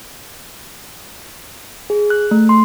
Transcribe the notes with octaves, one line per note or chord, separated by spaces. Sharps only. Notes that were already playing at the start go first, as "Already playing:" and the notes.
G#4
F#6
A3
C6